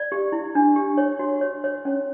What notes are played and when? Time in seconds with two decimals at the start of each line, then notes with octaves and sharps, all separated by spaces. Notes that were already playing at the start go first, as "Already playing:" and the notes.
Already playing: D5
0.12 G4
0.32 E4
0.55 D4
0.76 G4
0.98 C#5
1.19 F#4
1.41 C#5
1.64 C#5
1.85 C#4